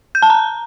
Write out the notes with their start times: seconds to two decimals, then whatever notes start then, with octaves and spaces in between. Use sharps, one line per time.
0.15 G6
0.22 A5
0.30 A#5